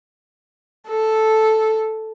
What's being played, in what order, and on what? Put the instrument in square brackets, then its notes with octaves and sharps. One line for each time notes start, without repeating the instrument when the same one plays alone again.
[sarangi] A4